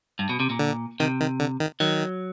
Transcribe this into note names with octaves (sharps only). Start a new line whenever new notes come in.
G2
B2
C3
A#2
D3
C3 D#3
D#3
D3
D#3
D#3 F#3